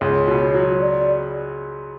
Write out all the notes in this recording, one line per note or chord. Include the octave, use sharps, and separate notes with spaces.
C#2 C#5
B2
F#3
D5